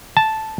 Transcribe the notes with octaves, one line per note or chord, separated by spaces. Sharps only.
A5